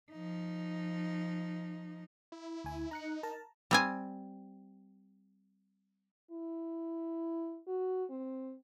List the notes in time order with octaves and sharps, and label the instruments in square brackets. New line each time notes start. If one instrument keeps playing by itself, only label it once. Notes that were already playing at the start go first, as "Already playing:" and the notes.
[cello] F3 D#4
[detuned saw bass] E4
[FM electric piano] D2 G#5
[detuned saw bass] D#4 [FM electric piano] A#5 F#6 C#7
[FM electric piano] A#4 A5 A#5
[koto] G3 C4 G#5
[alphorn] E4
F#4
C4